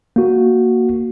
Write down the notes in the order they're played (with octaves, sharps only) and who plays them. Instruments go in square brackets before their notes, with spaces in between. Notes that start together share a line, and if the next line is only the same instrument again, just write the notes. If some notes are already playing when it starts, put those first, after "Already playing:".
[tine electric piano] A#3 F#4